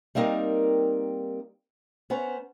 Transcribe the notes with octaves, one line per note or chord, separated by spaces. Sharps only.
G3 A#3 C4 D#4 A#4
B3 C#4 C5 A#5